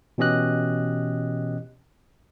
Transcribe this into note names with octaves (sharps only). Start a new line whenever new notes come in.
B2 E3 C#4 G4 D#5 F#6